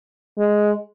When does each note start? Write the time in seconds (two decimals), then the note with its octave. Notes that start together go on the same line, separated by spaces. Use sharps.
0.39 G#3